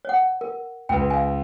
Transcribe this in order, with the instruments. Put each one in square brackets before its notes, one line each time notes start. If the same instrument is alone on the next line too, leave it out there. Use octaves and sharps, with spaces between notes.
[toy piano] C#5 F#5
A#4
[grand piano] C#2 [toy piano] B4 G5
[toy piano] F5 G#5